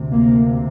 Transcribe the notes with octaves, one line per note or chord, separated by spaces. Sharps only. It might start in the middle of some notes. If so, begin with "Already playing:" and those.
Already playing: D2 C3
A#3